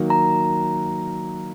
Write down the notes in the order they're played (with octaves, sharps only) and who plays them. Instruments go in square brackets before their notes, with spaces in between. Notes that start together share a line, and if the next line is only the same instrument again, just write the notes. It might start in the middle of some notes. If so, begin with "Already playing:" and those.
Already playing: [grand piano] D#3 F#3 A#3
[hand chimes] A#5